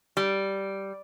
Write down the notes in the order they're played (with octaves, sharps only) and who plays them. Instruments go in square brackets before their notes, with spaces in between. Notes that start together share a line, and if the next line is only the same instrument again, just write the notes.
[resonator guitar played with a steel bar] G3